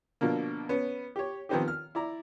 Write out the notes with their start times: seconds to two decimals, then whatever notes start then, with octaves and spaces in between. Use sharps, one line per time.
0.21 B2 D3 F3 A#3
0.69 B3 C#4
1.16 G4 C#5
1.49 D#3 F3 B3 C4 D#4 G4
1.68 F6
1.95 E4 D5 A#5